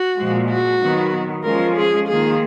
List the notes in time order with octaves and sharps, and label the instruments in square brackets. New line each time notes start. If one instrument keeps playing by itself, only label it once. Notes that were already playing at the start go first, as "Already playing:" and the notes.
Already playing: [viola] F#4
[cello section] A#2 F3 G#3
[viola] F#4
[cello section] D#3 F#3 B3
[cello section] F3 G#3 C#4 F4 [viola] A#4
[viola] G#4
[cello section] D#3 A#3 F4 [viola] G#4